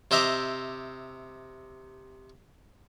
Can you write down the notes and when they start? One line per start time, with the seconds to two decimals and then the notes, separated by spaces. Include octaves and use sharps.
0.11 C3 C5 D#5 E5 A#5 D6